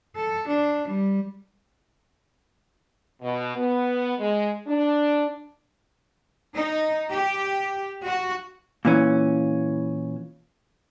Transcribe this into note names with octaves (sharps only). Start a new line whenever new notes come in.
A4
D4
G3
B2
B3
G#3
D4
D#4
G4
F#4
A#2 E3 C#4